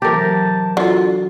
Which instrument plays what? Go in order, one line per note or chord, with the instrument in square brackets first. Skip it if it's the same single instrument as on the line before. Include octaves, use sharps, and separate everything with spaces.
[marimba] C3 E3 F#3 [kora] G4 A#4 [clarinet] A5
[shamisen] D3 [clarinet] F4 [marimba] F#4